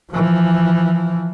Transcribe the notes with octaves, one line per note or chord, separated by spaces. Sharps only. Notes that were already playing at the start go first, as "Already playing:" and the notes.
E3 F3